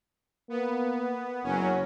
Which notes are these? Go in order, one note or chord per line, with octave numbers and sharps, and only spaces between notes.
A#3 B3
F#1 F#3 C#4